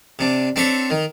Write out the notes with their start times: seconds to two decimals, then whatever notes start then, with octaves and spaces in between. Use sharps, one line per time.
0.19 C3 D4
0.56 C4 D4 A4 C#5 E5
0.90 D#3